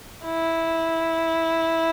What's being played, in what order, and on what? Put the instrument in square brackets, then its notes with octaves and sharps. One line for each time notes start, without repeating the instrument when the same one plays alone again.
[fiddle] E4